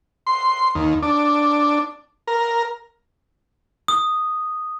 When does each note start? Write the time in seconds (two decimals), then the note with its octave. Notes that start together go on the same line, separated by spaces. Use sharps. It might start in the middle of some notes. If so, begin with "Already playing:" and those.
0.27 C6
0.75 D#2
1.02 D4
2.28 A#4
3.88 D#6